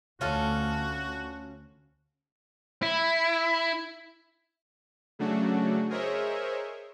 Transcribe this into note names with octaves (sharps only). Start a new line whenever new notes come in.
D2 C#4 F4 F#4 A4
E4
C#3 F#3 A3 D4 F#4
G#4 A#4 C5 C#5 D#5 E5